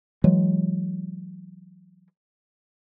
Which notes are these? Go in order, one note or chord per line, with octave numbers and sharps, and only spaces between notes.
E3 F#3 G#3